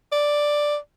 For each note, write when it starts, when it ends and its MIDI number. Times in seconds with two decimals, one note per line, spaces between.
0.12 0.77 74